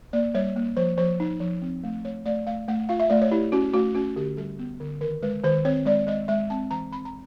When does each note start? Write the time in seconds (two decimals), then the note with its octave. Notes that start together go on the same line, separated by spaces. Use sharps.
0.13 A#3 D5
0.34 G3 C#5
0.56 A#3
0.77 F3 C5
0.98 F3 C5
1.20 D#4
1.40 F3
1.62 C4
1.84 A3
2.05 A3 C#5
2.26 A3 D5
2.47 A3 F5
2.68 A3 F#5
2.89 F4 F5
3.00 E5
3.10 A3 D5
3.21 C#5
3.31 E4 G4
3.52 C#4 F#4
3.74 A3 F#4
3.95 C#4 F#4
4.16 D3 G4
4.37 G3 A4
4.59 B3
4.80 D3
5.01 D#3 A#4
5.22 G#3 B4
5.44 D#3 C5
5.65 C4 C#5
5.86 G#3 D5
6.07 G#3 D#5
6.28 G#3 E5
6.50 C4 A5
6.71 E3 A#5
6.92 C4 B5
7.05 A#5